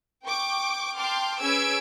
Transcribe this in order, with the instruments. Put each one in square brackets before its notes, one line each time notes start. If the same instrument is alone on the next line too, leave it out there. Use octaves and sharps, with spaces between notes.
[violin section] G5 C#6 D6
G5 A5 C6 D6 F6
C#4 G#4 B4 E6 G#6 D7